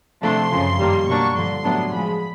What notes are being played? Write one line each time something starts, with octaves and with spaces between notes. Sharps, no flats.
C3 F3 A3 D4 C6
F#2 C#3 F3
G2 D#3 G3 A#3
B2 F#3 A#3 D4 C#6
G2 D3 F3 C6
A2 F#3 B3 D4
C#3 F3 G#3 B5